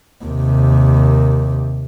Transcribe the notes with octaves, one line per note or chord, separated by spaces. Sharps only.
D#2 C3